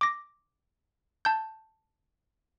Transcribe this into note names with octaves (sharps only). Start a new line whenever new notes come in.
D6 A#6
A5 G6